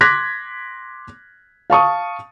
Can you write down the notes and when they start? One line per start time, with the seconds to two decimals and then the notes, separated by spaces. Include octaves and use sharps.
0.01 C6 D6 F#6 G#6 A#6 B6
1.70 F5 A5 C#6 D#6